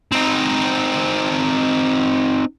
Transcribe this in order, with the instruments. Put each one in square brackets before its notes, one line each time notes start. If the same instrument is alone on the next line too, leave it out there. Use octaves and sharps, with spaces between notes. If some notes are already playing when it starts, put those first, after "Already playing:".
[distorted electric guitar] C4 D#4